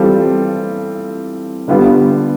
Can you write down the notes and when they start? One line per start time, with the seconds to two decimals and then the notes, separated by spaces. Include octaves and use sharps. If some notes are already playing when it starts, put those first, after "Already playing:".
Already playing: E3 G3 C4 F4 A4
1.68 D3 G3 B3 F4